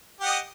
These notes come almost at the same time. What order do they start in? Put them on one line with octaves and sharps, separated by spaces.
G4 F#5 D#5